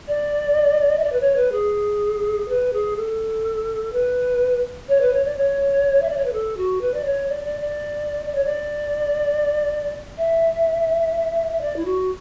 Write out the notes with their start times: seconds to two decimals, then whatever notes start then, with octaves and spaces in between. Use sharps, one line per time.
0.08 D5
0.99 E5
1.04 D5
1.12 B4
1.21 C#5
1.36 B4
1.52 G#4
2.49 B4
2.73 G#4
2.97 A4
3.93 B4
4.89 C#5
5.01 B4
5.13 C#5
5.25 D5
5.37 C#5
6.02 E5
6.09 D5
6.17 C#5
6.25 B4
6.33 A4
6.57 F#4
6.81 B4
6.94 D5
7.05 C#5
7.30 D5
7.45 D5
7.61 D5
8.26 D5
8.35 C#5
8.45 D5
10.18 E5
11.52 E5
11.61 D5
11.76 E4
11.85 F#4